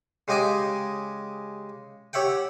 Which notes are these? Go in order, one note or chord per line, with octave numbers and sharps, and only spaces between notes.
C#3 G#3 G4 D#5 G#5 D6
G4 C#5 E5 F#5 G5